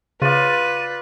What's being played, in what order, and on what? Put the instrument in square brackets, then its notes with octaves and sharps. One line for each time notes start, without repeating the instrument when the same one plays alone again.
[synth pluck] C#3 [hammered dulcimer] F4 D5 [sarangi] B4 [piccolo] D#7